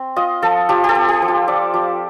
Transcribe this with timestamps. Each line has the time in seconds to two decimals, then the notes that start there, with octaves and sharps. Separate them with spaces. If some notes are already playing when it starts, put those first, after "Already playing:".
Already playing: C4
0.16 F4 D#5
0.42 F3 A4
0.69 F3 G4
0.84 G4 A4
0.95 C4
1.08 G4
1.22 F3
1.28 F4
1.48 F3 D5
1.74 F3